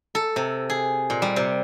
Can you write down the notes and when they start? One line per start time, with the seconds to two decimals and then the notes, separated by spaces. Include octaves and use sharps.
0.15 A4
0.36 C3
0.70 G#4
1.10 A#2
1.22 G3
1.36 C3